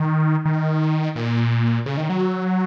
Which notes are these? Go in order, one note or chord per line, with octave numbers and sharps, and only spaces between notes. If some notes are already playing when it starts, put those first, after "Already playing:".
Already playing: D#3
D#3
A#2
C#3
D#3
F#3